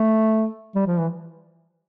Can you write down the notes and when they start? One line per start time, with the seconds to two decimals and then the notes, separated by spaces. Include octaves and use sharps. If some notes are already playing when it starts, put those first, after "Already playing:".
Already playing: A3
0.75 G3
0.87 F3
0.99 E3